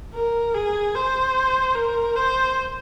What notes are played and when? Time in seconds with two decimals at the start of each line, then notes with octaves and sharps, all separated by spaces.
0.14 A#4
0.54 G#4
0.95 C5
1.75 A#4
2.16 C5